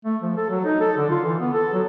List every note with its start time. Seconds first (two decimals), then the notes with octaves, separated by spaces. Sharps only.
0.05 A3
0.22 F3
0.37 A4
0.50 F#3
0.65 D#4
0.81 A4
0.98 D3
1.10 F4
1.25 E3
1.40 B3
1.54 A4
1.73 F#3